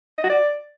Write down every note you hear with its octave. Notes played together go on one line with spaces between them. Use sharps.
D#5
F#4
D5